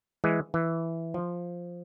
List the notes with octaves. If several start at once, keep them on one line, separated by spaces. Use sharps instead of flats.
E3 G#3
E3
F3